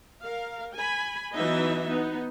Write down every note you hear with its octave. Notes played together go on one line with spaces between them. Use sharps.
A#4 F5
G#5 B5
E3 F#3 B3 D#4 D#5 E5
B3 D#4